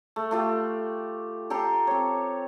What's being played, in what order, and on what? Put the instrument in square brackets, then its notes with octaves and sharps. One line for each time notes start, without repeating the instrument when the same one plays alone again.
[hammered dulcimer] A3
A3 F4 G4
G4 A4 A#5 C6
C4 C#5